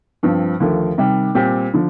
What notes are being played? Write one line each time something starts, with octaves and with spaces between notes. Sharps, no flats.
G2 F3 C4
D#2 D3 F3 A3
C3 D#3 G3
A#2 G3 C4 G4
D3 F3